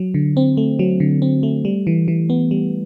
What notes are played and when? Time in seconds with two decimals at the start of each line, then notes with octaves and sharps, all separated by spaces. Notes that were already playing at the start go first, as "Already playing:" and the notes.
Already playing: F#3
0.14 D3
0.37 C4
0.57 A3
0.79 F#3
1.00 D3
1.22 C4
1.43 A3
1.65 G3
1.87 E3
2.08 E3
2.30 B3
2.51 G3